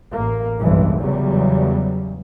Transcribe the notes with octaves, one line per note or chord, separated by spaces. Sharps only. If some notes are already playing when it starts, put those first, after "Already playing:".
A1 A#3
F1 B1 G2 E3 G#3
E2 C#3 F#3 G3